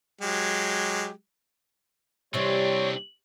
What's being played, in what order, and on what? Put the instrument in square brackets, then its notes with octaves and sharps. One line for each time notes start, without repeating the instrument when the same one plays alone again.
[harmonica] F#3 G#3 G4
[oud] C3 E3 [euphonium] G3 [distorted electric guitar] C4 D4 [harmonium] C#5